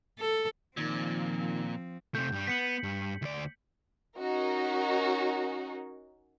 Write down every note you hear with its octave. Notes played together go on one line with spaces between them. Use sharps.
A4
A#2 D#3 F3 C4
C3 A3 G6
G2 G3
B3 B6 C#7 F#7
G2
D2 D5
C#4 D#4 F#4 A#4